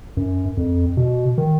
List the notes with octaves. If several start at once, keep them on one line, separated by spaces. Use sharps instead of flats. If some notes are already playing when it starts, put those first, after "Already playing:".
F#2
F2
B2
D#3